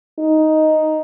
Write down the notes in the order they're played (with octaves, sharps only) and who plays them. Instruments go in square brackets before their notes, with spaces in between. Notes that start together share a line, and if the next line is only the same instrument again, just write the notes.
[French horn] D#4